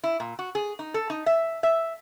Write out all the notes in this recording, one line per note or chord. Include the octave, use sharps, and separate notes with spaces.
E4
A#2
F#4
G#4
D#4
A4
D#4
E5
E5